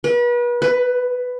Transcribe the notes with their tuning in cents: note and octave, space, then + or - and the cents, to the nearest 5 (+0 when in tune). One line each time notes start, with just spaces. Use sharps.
B4 -35
B4 +10